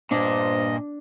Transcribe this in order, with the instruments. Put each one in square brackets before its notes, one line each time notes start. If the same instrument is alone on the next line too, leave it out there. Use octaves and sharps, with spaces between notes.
[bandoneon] G2 D#5 [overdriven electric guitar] A#2 [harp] D4 [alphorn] C5